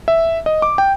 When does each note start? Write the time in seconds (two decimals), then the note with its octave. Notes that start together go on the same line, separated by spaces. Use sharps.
0.08 E5
0.46 D#5
0.62 D6
0.78 G5